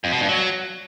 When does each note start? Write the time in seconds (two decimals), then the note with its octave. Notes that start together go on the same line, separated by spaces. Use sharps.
0.04 F2
0.12 B2
0.20 G2
0.29 F#3